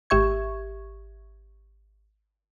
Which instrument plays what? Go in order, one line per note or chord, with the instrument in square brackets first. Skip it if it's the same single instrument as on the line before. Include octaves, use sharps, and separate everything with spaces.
[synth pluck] G#1 G4 E5 C#6 G#6